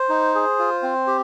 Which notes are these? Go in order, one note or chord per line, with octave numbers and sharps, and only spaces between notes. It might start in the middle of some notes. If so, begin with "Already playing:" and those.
Already playing: C5
D#4
G#4
F4
C4
G4